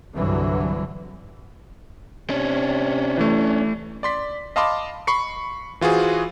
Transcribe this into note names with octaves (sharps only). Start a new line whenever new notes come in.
C2 G2 D3 E3 F#3
C3 C#4 D4
E3 A3
D5 C6 B6
D#5 F5 A5 B5 C6 D6
B5 C#6 C7 C#7
E3 F4 F#4 G#4 C5